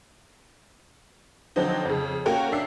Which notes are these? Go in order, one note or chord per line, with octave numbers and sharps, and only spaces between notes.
D3 F3 F#3 C4 D#4
F2 C#3
A#3 C#4 F#4 A#4 C#5 G5
G1 D4 E5 E6 C7